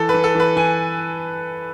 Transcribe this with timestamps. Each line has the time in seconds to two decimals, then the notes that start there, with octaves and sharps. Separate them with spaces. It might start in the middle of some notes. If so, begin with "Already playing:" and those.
Already playing: E3 A4
0.09 B4
0.14 E3
0.24 A4
0.35 E3 B4
0.56 E3 G#5